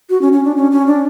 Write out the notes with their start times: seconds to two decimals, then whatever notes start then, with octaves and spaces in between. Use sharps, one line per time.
0.10 F#4
0.22 C#4
0.33 C#4
0.45 D4
0.56 C#4
0.72 C#4
0.87 D4